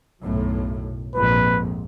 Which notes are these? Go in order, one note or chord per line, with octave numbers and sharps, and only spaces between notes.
B1 F#2 A2
A#1 F2 G#2 B4